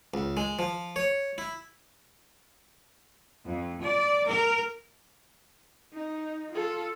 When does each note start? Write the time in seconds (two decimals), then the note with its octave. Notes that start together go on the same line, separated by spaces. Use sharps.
0.14 C#2
0.37 G#3
0.59 F3
0.96 C#5
1.38 E4
3.45 F2
3.83 D5
4.29 A#4
5.93 D#4
6.51 F4 A4